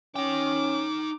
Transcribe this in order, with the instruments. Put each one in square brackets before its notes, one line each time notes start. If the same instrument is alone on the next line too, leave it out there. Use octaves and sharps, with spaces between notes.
[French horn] C#4 [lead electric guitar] D#4 G5 [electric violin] D6